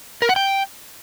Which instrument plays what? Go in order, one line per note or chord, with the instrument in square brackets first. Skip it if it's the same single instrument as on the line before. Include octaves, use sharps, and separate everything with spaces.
[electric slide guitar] A#4
F#5
G5